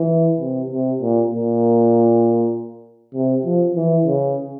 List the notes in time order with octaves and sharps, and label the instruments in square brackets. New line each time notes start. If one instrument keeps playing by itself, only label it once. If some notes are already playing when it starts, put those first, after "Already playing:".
Already playing: [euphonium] E3
C3
C3
A#2
A#2
C3
F3
E3
C#3